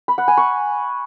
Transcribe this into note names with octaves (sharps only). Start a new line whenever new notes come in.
B5
F#5
G#5
C#6